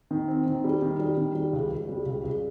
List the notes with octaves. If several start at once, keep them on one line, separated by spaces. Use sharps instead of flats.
D#3
C4
D#3
G3
D#3
G3
D#3
G3
C#2
C#2
G3
C#2
C#2